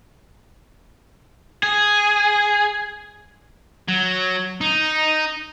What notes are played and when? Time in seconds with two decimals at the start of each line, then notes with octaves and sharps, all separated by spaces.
1.63 G#4
3.88 F#3
4.61 D#4